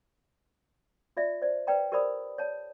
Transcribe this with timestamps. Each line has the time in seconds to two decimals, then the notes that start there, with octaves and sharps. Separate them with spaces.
1.17 F4 D5 E5
1.42 C5 D5
1.67 B4 C5 D5 G5 A#5
1.92 G4 A#4 C5 D5 B5 D#6
2.38 C#5 D5 A5